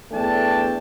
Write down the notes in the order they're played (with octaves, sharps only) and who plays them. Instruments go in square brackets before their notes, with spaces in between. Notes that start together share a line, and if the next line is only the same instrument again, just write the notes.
[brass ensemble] E2 A3 D4 G5 A5